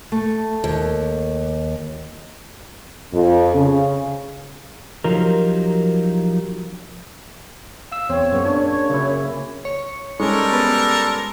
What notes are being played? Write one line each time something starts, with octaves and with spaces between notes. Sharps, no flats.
A3
D#2
F2
C#3
F3 F#3 D#4 G4 A#4
F5 E6
E2 C4 F4 C#5
F#2 A#2 C#3 A#3 B3
D4
C#5
F#2 A#2 C#3 E4
C#5
G3 G#3 C#4 A4 A#4 C#6
B3